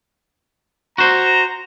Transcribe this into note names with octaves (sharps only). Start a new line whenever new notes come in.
F#4 C5 A#5